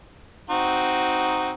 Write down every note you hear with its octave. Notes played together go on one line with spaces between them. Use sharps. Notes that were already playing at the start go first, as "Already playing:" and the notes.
C4 D#4 F#4